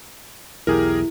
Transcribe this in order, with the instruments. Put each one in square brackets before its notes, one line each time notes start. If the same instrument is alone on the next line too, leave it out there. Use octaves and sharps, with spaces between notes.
[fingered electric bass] B1 E2 [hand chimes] E4 [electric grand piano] G4 G#4 A#4